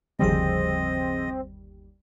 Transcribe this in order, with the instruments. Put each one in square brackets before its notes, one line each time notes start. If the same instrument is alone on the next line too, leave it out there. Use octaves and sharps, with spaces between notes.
[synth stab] G1 D#2 G3 [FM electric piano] C#3 F3 G#4 [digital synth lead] C4 [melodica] D#5